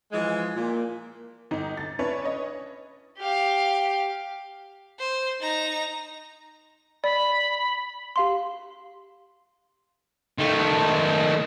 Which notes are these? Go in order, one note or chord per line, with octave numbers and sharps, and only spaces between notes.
E3 F3 G#3
A#2
G1 D#4
A6
C#4 D4 E4 B4 C#5
B4 C#5 D#5
G4 F5
C5
D#4 A#5
D5 B5
G4 F5 C6
D#3 A3